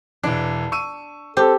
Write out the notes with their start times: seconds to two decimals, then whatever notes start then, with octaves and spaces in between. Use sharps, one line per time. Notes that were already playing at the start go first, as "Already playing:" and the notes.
0.24 E1 E3 D4
0.72 C#6 E6 D#7
1.37 C4 G4 A4